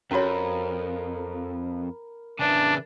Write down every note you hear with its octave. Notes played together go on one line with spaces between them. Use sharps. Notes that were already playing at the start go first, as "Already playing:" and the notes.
F2 C#4 F#4 A#4 C#5 B5
C#3 E3 D4